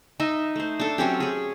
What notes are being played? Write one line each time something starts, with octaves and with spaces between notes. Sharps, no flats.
D#4 D#5 E5
A3 C5
D4 A4
F#3 C4 C#4 G4
C#4 G#4